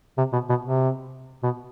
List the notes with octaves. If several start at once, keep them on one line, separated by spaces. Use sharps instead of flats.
C3
B2
B2
C3
B2